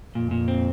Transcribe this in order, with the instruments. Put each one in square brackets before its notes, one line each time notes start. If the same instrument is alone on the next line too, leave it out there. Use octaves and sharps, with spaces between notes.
[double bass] F2 [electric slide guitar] A#2
[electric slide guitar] A#2
C4